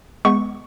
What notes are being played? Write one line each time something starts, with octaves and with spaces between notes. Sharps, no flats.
G#3 B3 C#6